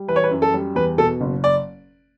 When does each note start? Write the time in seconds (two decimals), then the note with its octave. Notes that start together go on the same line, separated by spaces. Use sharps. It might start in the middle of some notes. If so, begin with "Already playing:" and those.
Already playing: G3
0.08 E3 B4
0.16 C#5
0.24 B4
0.31 F#2
0.42 A4
0.54 G3
0.75 E2 B4
0.98 B2 A4
1.21 F#1
1.44 D5